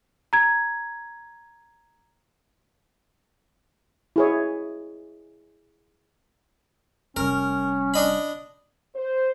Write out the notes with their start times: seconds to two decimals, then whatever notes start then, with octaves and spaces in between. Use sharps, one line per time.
0.33 A#5 G#6
4.16 E4 G#4 C#5
7.16 F1 G3 C#4 A#4
7.94 D4 D#5 B5
8.95 C5